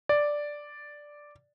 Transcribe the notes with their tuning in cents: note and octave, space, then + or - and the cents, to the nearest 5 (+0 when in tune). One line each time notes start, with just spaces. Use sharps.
D5 +0